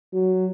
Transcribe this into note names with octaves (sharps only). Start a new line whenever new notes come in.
F#3